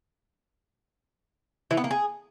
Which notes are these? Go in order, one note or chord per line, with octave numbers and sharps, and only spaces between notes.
E3
B3
A#3
G#4